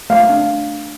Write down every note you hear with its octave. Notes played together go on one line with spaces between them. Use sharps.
A3 F5
D4